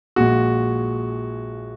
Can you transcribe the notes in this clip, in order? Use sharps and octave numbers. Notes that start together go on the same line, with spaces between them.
A#1 A#2 G#3 F#4